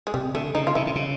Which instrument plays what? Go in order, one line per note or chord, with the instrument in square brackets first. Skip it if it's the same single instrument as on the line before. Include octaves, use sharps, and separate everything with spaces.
[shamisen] G#3
[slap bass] C3 [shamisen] G3
[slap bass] D3 [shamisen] A3
[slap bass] C#3 [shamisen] D#4
[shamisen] F4
[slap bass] C3 [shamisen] E4
[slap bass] C3
C#3